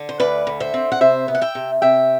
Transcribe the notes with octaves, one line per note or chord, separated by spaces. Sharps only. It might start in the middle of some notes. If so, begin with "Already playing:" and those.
Already playing: D3
C5
D2 B4 D5
D3
C5 E5
C4
F#5
C3 C5 E5
B3
F#5
E5 G5
C3
C3 E5 G5